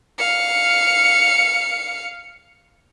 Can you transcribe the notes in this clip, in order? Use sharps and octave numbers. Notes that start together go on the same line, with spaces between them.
F5 C#7